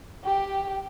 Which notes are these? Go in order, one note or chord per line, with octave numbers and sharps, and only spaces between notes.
G4 G5